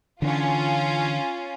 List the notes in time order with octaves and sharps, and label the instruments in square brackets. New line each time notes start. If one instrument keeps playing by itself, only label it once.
[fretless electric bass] D3 E3 [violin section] C#4 F4